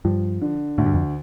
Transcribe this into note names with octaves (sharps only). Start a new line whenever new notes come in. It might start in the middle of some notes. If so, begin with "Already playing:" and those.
G2 F3
D3
D2 A2
G2
F2